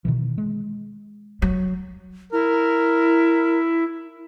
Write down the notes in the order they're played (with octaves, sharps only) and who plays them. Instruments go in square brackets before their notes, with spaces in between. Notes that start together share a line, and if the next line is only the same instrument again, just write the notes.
[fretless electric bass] B2 D#3 E3
G#3
[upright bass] F#3
[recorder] E4 [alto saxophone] A#4